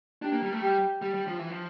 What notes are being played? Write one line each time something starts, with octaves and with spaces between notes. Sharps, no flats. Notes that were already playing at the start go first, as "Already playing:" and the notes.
D4 G4
A#3
G3
A3
G3 G4
G3 G4
G3
F3
E3
F3